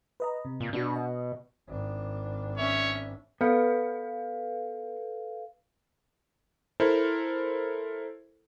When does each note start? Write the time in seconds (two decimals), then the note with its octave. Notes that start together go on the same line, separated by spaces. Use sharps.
0.20 B4 D#5 A#5
0.45 C3
0.60 A#2
0.73 B2 D4 F#4
0.95 D#5
1.68 G#1 D4
2.58 C#4 C#5 E5
3.41 B3 A4 B4 F5
6.80 E4 A4 A#4 C5